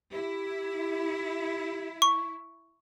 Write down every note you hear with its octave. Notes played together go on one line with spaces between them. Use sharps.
E4 G4
C#6